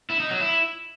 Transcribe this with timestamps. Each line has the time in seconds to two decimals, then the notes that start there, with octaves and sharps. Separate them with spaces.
0.10 E4
0.20 D#4
0.30 F#3
0.40 E4